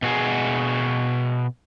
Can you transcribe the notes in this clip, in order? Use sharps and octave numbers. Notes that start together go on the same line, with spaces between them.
B2 F#4 G#4